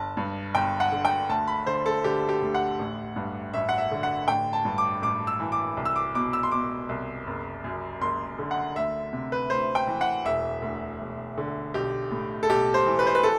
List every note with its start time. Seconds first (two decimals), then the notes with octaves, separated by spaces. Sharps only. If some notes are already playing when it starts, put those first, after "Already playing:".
Already playing: G1 A5
0.17 G2
0.54 G1 G5
0.80 F#5
0.92 D3
1.05 G5
1.29 D2 A5
1.48 B5
1.66 D3 C5
1.86 A4
2.04 D3 G4
2.29 G4
2.42 D2
2.54 F#5
2.79 A1
3.16 G2
3.53 A1 E5
3.69 F#5
3.78 E5
3.91 D3
4.03 F#5
4.28 A1 G5
4.53 A5
4.65 G2
4.78 D6
5.02 A1 D6
5.27 E6
5.40 E3
5.52 D6
5.77 C2
5.85 E6
5.96 D6
6.15 B2 D6
6.33 E6
6.43 C6
6.52 B2 D6
6.89 C2
7.27 F#1
7.64 F#2
8.01 F#1 C6
8.39 D3
8.51 F#5
8.76 D2 E5
9.13 C3
9.32 B4
9.50 D2 C5
9.75 G5
9.87 E3
10.01 F#5
10.25 E1 E5
10.62 D2
11.00 E1
11.38 D3
11.74 B1 G4
12.12 A2
12.43 A4
12.49 B1 G4
12.74 C5
12.86 E3
12.99 B4
13.07 C5
13.15 B4
13.23 A4